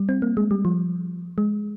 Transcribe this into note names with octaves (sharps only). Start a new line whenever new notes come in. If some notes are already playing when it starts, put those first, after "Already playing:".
Already playing: G3
C4
A#3
G#3
G3
F3
G#3